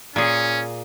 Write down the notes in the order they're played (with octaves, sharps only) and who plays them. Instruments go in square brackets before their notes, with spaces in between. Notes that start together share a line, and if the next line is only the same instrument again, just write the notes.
[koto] A#2 G#4 [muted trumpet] C#4